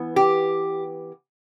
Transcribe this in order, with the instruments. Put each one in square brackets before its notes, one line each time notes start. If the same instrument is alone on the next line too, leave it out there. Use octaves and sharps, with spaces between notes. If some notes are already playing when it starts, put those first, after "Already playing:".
Already playing: [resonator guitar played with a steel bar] E3 B3
G4